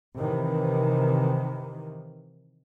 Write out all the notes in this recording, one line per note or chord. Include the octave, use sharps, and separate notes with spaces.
C3 D#3 E3